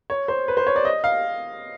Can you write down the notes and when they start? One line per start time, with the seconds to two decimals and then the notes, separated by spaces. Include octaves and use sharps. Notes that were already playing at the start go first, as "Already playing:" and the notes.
0.10 C#5
0.28 C5
0.48 B4
0.57 C5
0.67 C#5
0.76 D5
0.85 D#5
1.04 F5